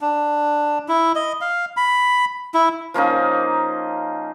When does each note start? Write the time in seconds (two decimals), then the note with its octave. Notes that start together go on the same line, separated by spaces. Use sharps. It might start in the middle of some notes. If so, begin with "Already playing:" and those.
0.01 D4
0.88 E4
1.15 D#5
1.41 F5
1.77 B5
2.54 E4
2.94 F3 A#3 C#4 D#4